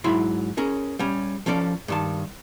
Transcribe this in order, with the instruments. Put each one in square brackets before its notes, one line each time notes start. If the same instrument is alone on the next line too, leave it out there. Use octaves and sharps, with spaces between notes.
[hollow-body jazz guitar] G#2 F#3 E4 E5 B5 C6
C#4 G#4 A#4
G3 C#4
F3 C#4 A4 D5
G2 D#3 A5